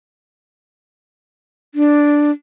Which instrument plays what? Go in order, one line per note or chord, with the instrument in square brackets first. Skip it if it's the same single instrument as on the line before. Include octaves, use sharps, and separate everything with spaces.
[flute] D4